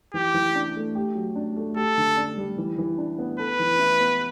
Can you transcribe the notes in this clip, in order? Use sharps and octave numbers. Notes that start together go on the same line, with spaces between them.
E3 G4
E3
D4
A3
G4
F#3
D4
A3
G4 A4
D3
D4
G3
E3
E3
D4
B3
A4 B4
E3
E4
B3